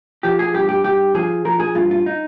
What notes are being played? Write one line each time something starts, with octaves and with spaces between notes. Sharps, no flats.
F3 G4
G#4
G2 G4
G4
G2 G4
F3 G#4
F3 A#4
G#4
G2 F4
F4
D#4